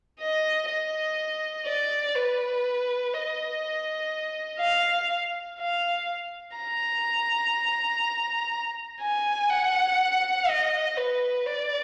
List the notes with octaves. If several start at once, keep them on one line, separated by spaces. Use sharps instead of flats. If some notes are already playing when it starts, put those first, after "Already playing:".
D#5
D#5
D5
B4
D#5
F5
F5
A#5
G#5
F#5
D#5
B4
D5